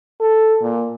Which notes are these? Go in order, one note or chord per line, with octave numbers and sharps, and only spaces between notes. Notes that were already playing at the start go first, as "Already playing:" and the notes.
A4
A#2